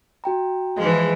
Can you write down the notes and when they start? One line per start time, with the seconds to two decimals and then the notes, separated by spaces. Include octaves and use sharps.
0.24 F#4 G5 A#5
0.77 E3 F3 G#3 G#4 D#5